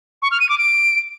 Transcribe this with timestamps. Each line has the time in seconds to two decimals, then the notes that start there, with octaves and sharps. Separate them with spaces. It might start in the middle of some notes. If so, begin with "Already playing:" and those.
0.22 C#6
0.31 F6
0.40 D#7
0.49 D6
0.58 D7